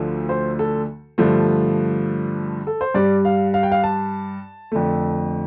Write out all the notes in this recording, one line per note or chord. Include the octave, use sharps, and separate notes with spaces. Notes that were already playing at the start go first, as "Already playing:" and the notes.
Already playing: D2 D3 F3 A3
C5
A4
G2 D3 F3 A3
A4
C5
G2 G3 D5
F5
F5
G5
F5
A5
F2 D3 A3